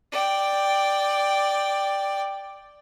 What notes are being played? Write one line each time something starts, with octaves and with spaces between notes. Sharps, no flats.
D5 G5